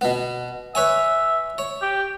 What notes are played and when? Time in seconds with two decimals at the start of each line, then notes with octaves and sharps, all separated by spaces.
0.01 B2 B3
0.75 B4 C#5 E5 G#5
1.58 C#5
1.82 G4